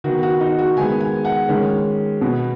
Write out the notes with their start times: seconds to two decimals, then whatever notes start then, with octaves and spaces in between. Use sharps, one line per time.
0.04 D#3 B3 F#4
0.23 F#4
0.40 D#4
0.59 F#4
0.77 D#3 G#3 B3 G#5
1.01 G#5
1.25 F#5
1.48 D#3 G#3 C#4
2.21 B2 B3